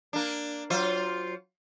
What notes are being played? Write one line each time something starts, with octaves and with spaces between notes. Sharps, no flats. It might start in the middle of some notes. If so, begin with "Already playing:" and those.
A#3 D4
F#3 F4 C5